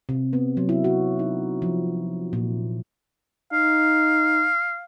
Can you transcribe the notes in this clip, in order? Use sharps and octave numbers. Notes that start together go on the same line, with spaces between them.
C3
B3
F#3
E4
F#4
D#4
F3
A#2
D#4 F5